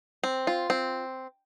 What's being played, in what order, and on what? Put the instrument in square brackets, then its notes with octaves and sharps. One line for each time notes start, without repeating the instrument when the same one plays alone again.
[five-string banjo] C4
F4
C4